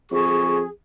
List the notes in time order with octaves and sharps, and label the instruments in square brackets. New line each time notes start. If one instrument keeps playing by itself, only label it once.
[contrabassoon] F2 [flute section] G#4 [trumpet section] C#6